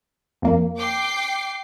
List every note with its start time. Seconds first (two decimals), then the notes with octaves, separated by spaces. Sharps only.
0.42 F2 A#3
0.78 G5 D6 C7